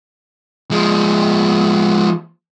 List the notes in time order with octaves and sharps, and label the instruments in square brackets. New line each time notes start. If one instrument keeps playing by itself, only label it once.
[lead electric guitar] F3 G#3